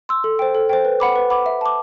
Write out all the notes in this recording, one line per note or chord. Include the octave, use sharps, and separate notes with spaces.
C6 E6
A4
C5 G5
A4
C5 G5
B4
F#5 B5 D6
B4
F#5 B5 D6
E5
A5 D6